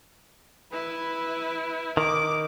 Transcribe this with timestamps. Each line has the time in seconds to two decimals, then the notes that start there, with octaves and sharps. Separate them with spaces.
0.72 E4 B4
1.97 D#3 D6